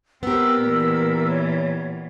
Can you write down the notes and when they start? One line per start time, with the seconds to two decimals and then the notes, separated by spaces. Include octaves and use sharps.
0.23 B3 C4 G4 A#4 E6
0.63 A#2 E3
1.28 C#5